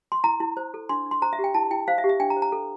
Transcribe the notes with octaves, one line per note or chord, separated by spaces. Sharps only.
C6
E4 A#5
E4
C5
A4
D4 C6
D4
C6
C5 A#5
E5
G4
G5
E4 A5
E4 G5
C5 F5
E5
G4
E5
D4 G5
A#5
C5
A#5
A4